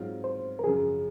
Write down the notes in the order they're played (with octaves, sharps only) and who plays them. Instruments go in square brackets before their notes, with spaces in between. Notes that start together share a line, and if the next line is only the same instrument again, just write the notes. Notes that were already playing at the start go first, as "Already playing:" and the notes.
Already playing: [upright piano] G#2 F#3 C4 F4 [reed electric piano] C5
[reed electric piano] C5
A#4
[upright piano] F#2 C#3 F3 [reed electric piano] G#4